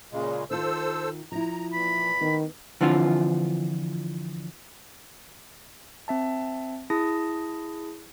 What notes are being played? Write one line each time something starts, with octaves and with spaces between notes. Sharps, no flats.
A#2 C#3 G#3
D#3 F4 A4 C5 E6
F3 E4 A#5
A#2 E3 B5
D#3 B3
D3 E3 F3 C4 F4
C4 E5 A5
E4 G#4 A5 D#6 A#6